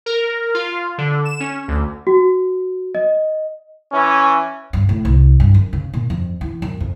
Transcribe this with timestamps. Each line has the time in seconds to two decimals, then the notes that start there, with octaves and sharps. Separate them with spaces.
0.06 A#4
0.55 F4
0.98 D3
1.25 E7
1.40 C#4
1.68 D2
2.07 F#4
2.95 D#5
3.93 E3 C#4
4.73 G2
4.89 A2
5.05 C2
5.40 G2
5.54 F#2
5.73 C#3
5.94 A#2
6.10 F2
6.41 E3
6.62 F#2
6.80 F2